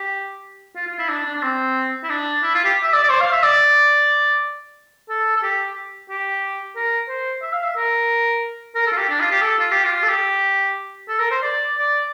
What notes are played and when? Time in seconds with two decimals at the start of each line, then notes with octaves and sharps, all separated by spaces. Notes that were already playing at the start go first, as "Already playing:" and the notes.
Already playing: G4
0.75 F4
0.87 F4
0.99 E4
1.09 D4
1.26 D4
1.36 D4
1.42 C4
2.04 E4
2.10 D4
2.43 E4
2.54 F4
2.64 G4
2.83 E5
2.93 D5
3.03 D5
3.10 C5
3.20 F5
3.32 E5
3.43 D5
5.09 A4
5.36 A4
5.43 G4
6.09 G4
6.76 A#4
7.08 C5
7.42 E5
7.53 F5
7.64 E5
7.76 A#4
8.75 A#4
8.87 A4
8.92 F4
8.97 G4
9.09 D4
9.20 F4
9.31 G4
9.42 A4
9.59 F4
9.71 G4
9.84 F4
10.03 A4
10.08 G4
11.08 A4
11.19 A#4
11.31 C5
11.42 D5
11.76 D5